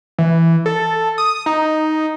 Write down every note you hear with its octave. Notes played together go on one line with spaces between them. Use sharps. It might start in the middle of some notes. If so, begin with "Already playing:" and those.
E3
A4
D#6
D#4